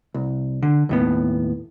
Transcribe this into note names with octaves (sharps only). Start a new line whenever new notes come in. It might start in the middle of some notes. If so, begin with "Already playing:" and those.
C2
D3
D#2 A2 B3